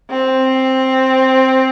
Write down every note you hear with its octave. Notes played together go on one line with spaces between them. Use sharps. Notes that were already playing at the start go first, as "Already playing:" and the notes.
C4